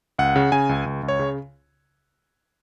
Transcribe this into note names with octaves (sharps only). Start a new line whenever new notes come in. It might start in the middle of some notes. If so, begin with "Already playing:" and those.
C#2 F#5
C#3
C#3 G#5
C#2
C#2
C#2
C#5
C#3